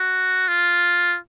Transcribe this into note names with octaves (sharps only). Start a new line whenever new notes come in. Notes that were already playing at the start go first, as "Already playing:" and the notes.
Already playing: F#4
F4